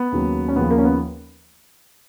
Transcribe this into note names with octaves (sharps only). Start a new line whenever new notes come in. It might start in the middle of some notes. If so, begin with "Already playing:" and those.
Already playing: B3
D#2 C#3 F#3
C#4
D#2 C#3 F3 B3
A#3
C#4
B3